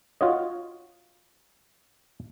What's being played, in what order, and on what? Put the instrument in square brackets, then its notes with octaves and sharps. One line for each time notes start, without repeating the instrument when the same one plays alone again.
[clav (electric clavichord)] F4 F#4 C#5 D#5